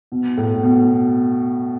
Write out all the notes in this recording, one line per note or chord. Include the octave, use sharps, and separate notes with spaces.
B2
A2
B2